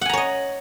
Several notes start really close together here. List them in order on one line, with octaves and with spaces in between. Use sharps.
F#5 G#5 A#5 C#5 D#5